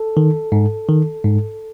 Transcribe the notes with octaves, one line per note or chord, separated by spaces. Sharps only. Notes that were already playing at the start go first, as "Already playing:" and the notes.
Already playing: A4
D#3
G#2
D#3
G#2